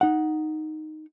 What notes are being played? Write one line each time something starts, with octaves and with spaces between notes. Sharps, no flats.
D#4 F#5